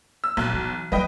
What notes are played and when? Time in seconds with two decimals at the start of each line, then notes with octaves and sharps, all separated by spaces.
0.24 E6
0.37 B1 A#2 F#6
0.54 E3
0.92 F3 F#3 B4 D#5 G5